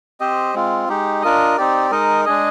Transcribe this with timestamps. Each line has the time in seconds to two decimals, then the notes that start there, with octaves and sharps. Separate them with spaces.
0.20 C4 G4 C5 D#5
0.54 G#3 C4 F4
0.89 G#3 D#4 G4
1.22 D4 F4 A#4 D#5
1.58 C4 D#4 G4 D5
1.91 G#3 D#4 A#4 D#5
2.25 G#3 D4 G#4 D#5